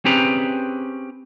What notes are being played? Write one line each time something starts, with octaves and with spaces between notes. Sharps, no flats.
C4 C#4 G4 G#4 B4 A#5